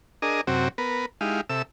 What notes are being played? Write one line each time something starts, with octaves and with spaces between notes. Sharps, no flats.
D4 G#4 A#4 D#5
F#2 C3 C4 F#4
B3 A#4 B4
G#3 D#4 E4 G4 F5
C3 A4 E5 E6